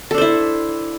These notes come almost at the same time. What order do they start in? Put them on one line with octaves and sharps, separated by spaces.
A4 D4 C5 E4